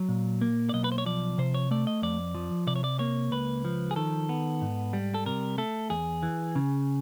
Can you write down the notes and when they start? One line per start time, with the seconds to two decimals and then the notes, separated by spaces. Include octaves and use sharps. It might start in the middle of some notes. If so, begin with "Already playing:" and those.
Already playing: F#3 C#5
0.09 A#2
0.41 A#3
0.69 D5
0.73 B1 D#5
0.84 B4
0.92 C5
0.98 C#5
1.06 F3 D5
1.38 C3 C5
1.54 C#5
1.71 A3 D5
1.87 D#5
2.02 F2 D5
2.35 F3
2.67 C3 D5
2.76 C#5
2.84 D5
2.99 A#3 C#5
3.32 C#2 B4
3.65 F3
3.91 G#4
3.96 D#3 A4
4.29 B3
4.62 G#2
4.93 G3
5.14 A4
5.26 C3 A#4
5.58 A3 A4
5.90 E2 G#4
6.23 E3
6.56 C#3